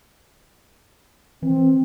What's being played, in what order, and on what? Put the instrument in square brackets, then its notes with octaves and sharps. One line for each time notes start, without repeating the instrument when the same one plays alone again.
[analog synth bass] E3 [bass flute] C4